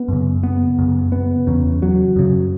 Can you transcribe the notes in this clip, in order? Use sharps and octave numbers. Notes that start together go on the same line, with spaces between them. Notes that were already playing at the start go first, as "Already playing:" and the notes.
Already playing: B3
F#2 C#3
B3
F#2 C#3
B3
E2 C#3
F#3
F#2 C#3